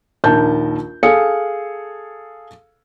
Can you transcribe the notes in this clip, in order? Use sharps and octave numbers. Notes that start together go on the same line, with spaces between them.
A#1 D#2 A#4 A5 G6
G#4 A4 F5 C#7